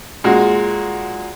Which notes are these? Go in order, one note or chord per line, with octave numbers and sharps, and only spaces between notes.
A#2 G#3 F#4